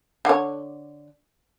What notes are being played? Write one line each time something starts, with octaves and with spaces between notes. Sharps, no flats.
D3 C#5